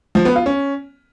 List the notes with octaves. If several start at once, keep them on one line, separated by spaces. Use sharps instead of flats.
F3
B3
F4
C#4